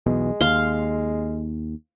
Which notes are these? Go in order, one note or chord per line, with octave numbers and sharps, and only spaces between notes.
B1 E2 B2 G#3
D#2 F5 C6